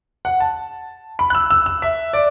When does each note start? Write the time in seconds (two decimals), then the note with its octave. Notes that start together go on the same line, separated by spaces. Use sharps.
0.25 F#5
0.40 A5
1.19 B5
1.30 F#6
1.35 E6
1.51 E6
1.66 E6
1.82 E5
2.13 D5